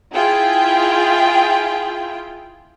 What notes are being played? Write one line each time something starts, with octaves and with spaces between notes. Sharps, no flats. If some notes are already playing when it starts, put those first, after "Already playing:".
E4 F4 G#4 G5